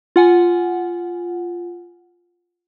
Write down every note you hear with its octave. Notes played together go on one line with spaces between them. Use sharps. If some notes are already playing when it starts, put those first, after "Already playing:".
F4 F#5 G#5